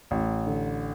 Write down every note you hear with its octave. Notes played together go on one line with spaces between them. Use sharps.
A1
D3